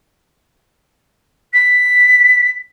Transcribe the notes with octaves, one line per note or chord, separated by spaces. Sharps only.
B6